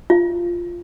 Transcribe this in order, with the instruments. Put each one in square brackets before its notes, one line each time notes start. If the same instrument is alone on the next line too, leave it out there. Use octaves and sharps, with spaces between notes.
[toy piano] F4